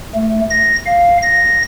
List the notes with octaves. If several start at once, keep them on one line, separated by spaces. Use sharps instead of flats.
A3
A#6
F5
A#6